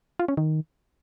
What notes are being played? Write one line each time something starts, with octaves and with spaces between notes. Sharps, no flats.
F4
C#4
D#3